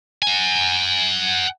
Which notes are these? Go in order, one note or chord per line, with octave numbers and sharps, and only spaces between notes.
F#5 G#5